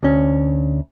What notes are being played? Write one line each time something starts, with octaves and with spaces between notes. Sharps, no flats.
D2 C#4